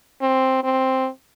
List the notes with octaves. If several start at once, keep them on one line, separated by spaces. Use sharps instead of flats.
C4
C4